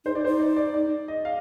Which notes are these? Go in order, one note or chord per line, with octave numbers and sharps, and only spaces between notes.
D#4 C5
D5
D#4 C5
D5
D5
D5
D#5
F5